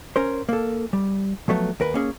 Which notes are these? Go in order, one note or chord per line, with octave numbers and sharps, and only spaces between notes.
C#4 A#4 C5
A#3 A4
G3
F3 F#3 A3 B3
D#2 A#4 B4
A#3 C#4 G#4